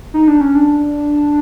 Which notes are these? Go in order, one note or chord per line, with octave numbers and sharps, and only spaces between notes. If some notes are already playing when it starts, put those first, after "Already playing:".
D#4
D4
C#4
D4